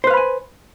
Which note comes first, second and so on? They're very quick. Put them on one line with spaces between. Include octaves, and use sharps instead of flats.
C5 B4 F5 B5 G#5